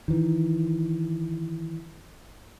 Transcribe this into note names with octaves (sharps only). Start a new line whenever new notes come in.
D#3 E3